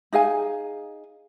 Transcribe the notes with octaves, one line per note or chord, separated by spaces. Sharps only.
D#4 G#4 F5 G#5